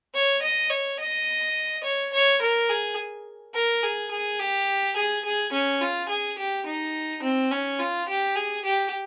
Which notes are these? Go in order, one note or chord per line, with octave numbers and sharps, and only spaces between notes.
C#5
D#5
C#5
D#5
C#5
C#5
A#4
G#4
A#4
G#4
G#4
G4
G#4
G#4
C#4
F4
G#4
G4
D#4
C4
C#4
F4
G4
G#4
G4